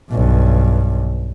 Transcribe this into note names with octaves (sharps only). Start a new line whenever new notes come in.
B1 G2